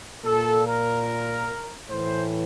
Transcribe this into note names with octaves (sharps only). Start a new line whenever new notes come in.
A#2 A4
A#4
A2 E3 C5